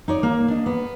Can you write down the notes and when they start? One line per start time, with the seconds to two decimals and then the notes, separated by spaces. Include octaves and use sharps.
0.08 D#4 C#5 D5
0.23 A#3
0.48 D4 D#5
0.66 B3